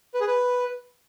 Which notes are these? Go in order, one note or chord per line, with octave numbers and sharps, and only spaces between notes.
B4
G#4
B4